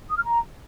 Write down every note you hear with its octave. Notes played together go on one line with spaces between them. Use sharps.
D#6
F6
A#5